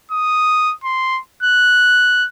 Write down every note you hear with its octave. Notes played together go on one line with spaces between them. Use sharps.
D#6
C6
F#6